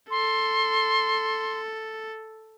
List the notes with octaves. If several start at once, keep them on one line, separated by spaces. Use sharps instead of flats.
A4 C6